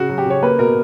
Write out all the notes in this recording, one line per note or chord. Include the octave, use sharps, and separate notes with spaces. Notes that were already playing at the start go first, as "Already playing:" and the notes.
Already playing: C#3 F#4
F#3
G4
C#3 C#5
A#3 B4
B2 A#4